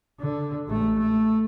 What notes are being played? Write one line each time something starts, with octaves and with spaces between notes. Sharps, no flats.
D3
A1 A3
A3